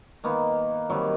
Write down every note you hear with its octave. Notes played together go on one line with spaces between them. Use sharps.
D#3 A#3 B3
C3 D#3 F#3 G3